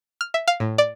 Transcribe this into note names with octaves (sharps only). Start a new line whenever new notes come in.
F6
E5
F5
A2
D5